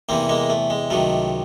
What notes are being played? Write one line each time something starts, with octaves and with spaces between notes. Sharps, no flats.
E2 C3 E3 A#3 C4
G#3 A#3
A3
G#3
C#2 C3 D#3 F#3 A3